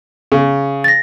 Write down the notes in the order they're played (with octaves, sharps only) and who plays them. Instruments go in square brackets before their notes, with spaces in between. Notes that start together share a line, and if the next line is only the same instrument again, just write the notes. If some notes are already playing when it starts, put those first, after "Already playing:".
[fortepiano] C#3
[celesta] A6 A#6